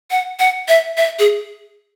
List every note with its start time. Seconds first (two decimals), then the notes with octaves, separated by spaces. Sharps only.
0.11 F#5
0.39 F#5
0.68 E5
0.97 E5
1.19 G#4